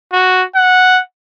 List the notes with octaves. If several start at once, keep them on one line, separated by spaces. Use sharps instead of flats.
F#4
F#5